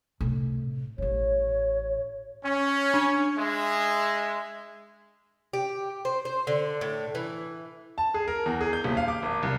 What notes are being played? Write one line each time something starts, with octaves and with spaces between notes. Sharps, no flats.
A2 C3
A1 C#4 C#5
C#4
D4
G#3 E5
G4
C5
C5
D3
A2
E3
A5
G#4
A#4
E2
G#4
G6
D#1
F5
D6
G#1
C2